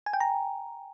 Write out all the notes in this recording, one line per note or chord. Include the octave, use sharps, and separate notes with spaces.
G#5
G5
A#5